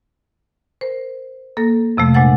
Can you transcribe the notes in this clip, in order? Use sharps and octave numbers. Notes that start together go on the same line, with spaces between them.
A#4 C5
A#3 A4 A#6
F2 C3 F3 A3
A#2 G#3 D4 C5 F#5 A6